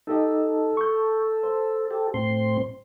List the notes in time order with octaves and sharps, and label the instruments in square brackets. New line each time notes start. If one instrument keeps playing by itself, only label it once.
[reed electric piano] D#4 G4 D#5 [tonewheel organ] A4
[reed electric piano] C#6 G6
C5
[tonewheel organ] G4 A4
A2 C4 C6